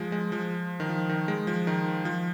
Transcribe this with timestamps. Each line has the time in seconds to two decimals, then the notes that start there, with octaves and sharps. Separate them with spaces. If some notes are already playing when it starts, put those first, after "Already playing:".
Already playing: F3 G#3
0.12 G#3
0.32 F3
0.80 D#3
0.89 F3
1.09 D#3
1.28 G#3
1.47 F3
1.67 D#3
2.05 F3